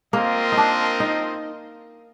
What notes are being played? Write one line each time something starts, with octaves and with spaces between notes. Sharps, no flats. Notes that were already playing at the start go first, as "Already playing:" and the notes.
A#3 C4 F4 A#4 D#5
D#4
D4
D#4